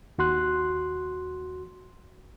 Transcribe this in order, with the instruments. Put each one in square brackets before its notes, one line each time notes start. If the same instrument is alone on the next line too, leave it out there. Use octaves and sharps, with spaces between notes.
[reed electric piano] D#2 F#4 C6 F#6